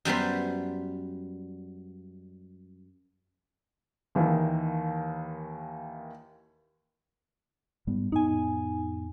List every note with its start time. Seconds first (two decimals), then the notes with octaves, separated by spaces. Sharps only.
0.05 F#2 G3 B3 C5
4.15 D#2 D#3 E3 A#3
7.87 G#2 G3 B3
8.12 F2 A2 B3 D#4 G#5